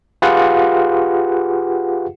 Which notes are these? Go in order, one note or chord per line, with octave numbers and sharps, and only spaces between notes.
F4 G4 G#4 B4 F5 F#5